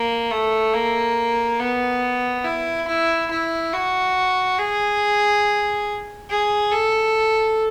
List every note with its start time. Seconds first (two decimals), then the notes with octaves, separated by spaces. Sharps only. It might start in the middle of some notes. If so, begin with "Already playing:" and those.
Already playing: A#3
0.31 A3
0.73 A#3
1.59 B3
2.44 E4
2.88 E4
3.31 E4
3.73 F#4
4.58 G#4
6.30 G#4
6.71 A4